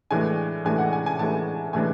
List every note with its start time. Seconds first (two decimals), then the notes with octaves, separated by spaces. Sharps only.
0.11 A2 E3 G#3 D4 G#5
0.65 A2 E3 G#3 D4 G#5
0.78 F#5
0.93 G#5
1.06 G#5
1.19 A2 E3 G#3 D4 A5
1.73 A2 E3 G#3 D4 G#5